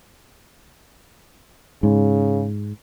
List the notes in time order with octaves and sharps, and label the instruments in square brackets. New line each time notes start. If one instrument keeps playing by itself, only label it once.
[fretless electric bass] G#2 [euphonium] C#3